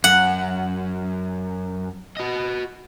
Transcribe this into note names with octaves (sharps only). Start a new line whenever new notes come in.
F#2 F#5
F#4 D#5